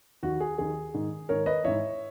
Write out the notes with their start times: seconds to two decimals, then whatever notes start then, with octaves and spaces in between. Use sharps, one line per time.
0.23 D#2 D#3 F#4
0.40 G#4
0.58 D#2 D#3 G#4
0.94 G#2 D#3
1.29 G#2 D#3 A#4 C#5
1.46 B4 D#5
1.64 G#2 E3 C#5 E5